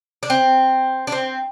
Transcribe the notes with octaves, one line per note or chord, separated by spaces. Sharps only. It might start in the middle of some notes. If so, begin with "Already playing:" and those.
D4
C4
D4
C4